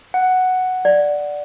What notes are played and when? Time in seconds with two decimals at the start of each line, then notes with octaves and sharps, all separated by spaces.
0.14 F#5
0.85 D5